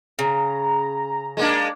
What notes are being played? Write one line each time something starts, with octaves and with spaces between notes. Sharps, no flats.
C#3 A#5
G#3 A#3 D4